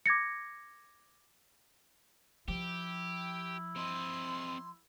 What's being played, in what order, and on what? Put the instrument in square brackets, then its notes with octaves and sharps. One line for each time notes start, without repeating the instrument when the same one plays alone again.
[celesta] D6 G#6 A#6 C#7
[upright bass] F3 [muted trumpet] E4 [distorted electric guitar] G4
[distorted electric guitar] C4 D#5 [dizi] C6